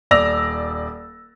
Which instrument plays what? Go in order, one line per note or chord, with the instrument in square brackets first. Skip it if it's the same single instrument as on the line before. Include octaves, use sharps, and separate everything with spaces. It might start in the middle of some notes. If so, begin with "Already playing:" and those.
[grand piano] D#1 D5 E6 A#6 F7